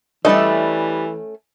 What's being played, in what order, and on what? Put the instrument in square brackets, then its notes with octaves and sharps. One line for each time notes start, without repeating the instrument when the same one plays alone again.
[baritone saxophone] E3 [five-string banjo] G3 D4 D#5 [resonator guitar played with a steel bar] A3 C#4